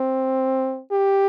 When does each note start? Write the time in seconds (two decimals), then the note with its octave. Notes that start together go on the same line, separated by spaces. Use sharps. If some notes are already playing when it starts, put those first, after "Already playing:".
Already playing: C4
0.91 G4